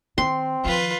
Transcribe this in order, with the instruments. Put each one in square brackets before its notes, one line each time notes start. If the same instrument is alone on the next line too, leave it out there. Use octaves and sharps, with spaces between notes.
[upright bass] D#3 [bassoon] C4 [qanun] C6
[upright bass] D#3 F3 [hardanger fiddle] F4 B4